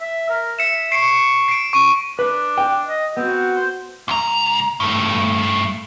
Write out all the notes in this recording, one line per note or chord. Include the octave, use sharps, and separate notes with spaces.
E5
A#4
E5 C#7 E7
C#6 C7 D7
C7 D7
C#6 D#7
D4 B4
G5
D#5
B3 C4 F#4
C5
C#2 A#5
G2 A3